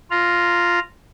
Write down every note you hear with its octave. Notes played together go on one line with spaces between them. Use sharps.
F4 A#5